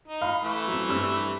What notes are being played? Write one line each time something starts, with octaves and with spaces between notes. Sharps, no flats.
D#4
F5 B5
E3 A3 E5
F#3 C4
G2 C4 E6